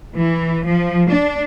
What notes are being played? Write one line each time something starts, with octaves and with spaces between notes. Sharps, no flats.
E3
F3
D4